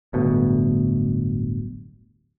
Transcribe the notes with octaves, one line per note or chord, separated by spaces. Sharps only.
D1 G1 D2 B2